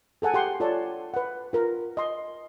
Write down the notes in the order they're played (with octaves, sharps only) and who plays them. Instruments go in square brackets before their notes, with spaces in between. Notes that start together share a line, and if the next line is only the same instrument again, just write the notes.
[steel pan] G#4 A4 F#5 G#5
G4 F#5 G5 C6
F4 A4 C#5 D5 A5
B4 F#5
F4 A#4
D#5 C6